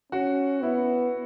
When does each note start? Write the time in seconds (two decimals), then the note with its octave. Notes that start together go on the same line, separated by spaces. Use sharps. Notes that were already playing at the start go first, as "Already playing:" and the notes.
0.12 C#4 F#4
0.62 B3 E4